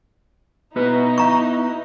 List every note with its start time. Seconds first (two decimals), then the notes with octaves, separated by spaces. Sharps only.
0.76 B3 D#4 E4 F#4 B4
1.18 F5 A#5 C#6